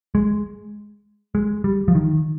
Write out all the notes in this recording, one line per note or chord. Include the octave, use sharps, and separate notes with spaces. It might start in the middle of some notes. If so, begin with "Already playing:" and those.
G#3
G#3
G3
F3
D#3